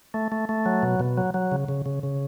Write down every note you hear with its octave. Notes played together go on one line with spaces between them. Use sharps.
A3
A3
A3
F#3
B2
B2
F#3
F#3
C#3
C#3
C#3
C#3